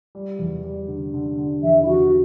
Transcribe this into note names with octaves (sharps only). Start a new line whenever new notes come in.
G3
E2
G3
D3
D3
D3
E2 E5
E4
E2 F#4